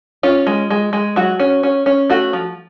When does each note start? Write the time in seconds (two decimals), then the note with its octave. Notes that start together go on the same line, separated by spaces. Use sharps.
0.23 C#4 F4
0.47 G#3
0.70 G#3
0.93 G#3
1.16 F#3 F#4
1.40 C#4
1.63 C#4
1.86 C#4
2.10 A3 F#4
2.33 F3